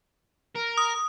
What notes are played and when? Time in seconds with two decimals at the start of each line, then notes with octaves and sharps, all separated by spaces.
0.56 A#4
0.77 D#6